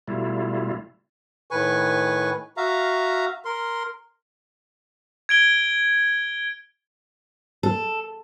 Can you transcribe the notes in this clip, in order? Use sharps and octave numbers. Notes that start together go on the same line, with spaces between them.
B2 G3 A3 E4 F4
A2 D#3 B4 G#5 C#6
F#4 E5 F5 A#5
A#4 C6
G#6 D7 G7
A4